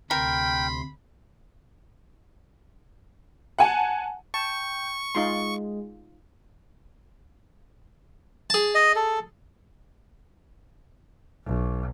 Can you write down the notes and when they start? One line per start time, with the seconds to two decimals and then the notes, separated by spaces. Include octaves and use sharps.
0.11 D2 C3 A#4 G5 B5 C6
3.59 F#5 G#5 A5
4.34 G5 A5 C#6
5.15 G#3 D#4 F4 C6
8.50 G#4 A5
8.75 D#5
8.96 A4
11.45 B1